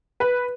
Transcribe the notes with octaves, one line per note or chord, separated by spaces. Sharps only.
B4